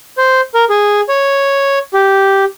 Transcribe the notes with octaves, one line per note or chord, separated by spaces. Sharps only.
C5
A#4
G#4
C#5
G4